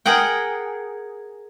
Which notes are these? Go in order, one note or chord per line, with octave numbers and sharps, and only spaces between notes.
G#4 A#4 F#5 G5